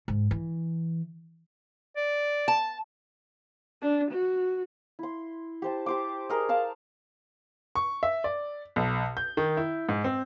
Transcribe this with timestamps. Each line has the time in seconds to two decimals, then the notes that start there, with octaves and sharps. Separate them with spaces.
0.08 G#2
0.31 E3
1.97 D5
2.48 A5
3.82 D4
4.11 F#4
4.99 E4 C6
5.62 G4 C5 A5
5.86 G4 C5 D6
6.29 G#4 A#4 D#5
6.49 D5 F5 A5
7.75 C#6
8.03 E5
8.24 D5
8.76 B1
9.17 G6
9.37 D#3
9.57 E4
9.89 G#2
10.04 C4